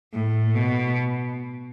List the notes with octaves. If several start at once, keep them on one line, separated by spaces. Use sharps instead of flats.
A2
B2